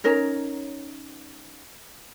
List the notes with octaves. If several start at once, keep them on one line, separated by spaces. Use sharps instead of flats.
C#4 D#4 A#4 C#5